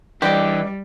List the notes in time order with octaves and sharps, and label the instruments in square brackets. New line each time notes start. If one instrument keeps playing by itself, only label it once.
[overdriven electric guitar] E3 D4 [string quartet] G3 [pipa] G4 [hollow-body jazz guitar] B4 D5 D#5